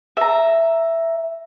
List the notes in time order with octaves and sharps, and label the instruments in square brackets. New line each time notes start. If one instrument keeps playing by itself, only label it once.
[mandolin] E5 A#5